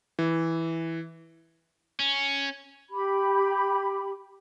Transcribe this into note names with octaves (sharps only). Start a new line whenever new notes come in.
E3
C#4
G4 B5